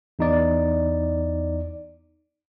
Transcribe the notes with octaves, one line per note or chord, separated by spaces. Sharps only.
E2 D#4 D5